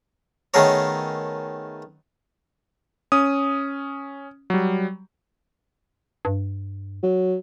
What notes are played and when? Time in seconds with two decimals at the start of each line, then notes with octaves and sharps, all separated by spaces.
0.54 D#3 A3 B3 G#4 A#4 C#5
3.12 C#4 D#6
4.50 F#3 G3
6.25 G2
7.03 F#3